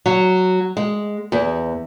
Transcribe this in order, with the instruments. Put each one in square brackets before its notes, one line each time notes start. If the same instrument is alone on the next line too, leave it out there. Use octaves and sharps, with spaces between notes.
[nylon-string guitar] F#3
G#3
E2